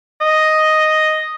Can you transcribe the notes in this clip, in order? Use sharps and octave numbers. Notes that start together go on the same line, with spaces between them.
D#5